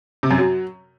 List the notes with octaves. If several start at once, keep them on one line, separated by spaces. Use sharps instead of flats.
C3
F#2
F#3